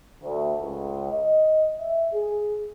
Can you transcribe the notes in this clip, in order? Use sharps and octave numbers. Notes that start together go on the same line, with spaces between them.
D2
C#2
D#5
E5
G#4